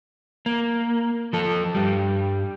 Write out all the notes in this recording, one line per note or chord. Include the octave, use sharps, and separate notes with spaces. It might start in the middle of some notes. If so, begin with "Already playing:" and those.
A#3
F3 A4
G2 G3